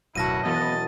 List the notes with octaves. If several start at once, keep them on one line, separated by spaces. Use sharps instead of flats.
D1 F#2 B2 E4 F#4 A5 A#6 D#7
E1 B2 B3 D#5 A6